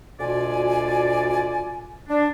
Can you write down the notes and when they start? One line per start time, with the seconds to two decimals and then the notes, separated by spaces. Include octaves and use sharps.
0.20 D2 B2 F4 D5 G#5
2.09 D4